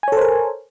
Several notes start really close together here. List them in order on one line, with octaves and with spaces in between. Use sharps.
G#5 C#5 A4 C5 A#4